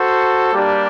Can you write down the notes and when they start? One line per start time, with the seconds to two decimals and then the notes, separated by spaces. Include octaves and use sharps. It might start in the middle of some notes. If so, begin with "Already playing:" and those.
Already playing: F#4 A4 C5
0.53 G3 A#3 D4 G4